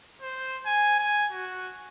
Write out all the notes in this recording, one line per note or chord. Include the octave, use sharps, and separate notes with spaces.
C5
G#5
G#5
F#4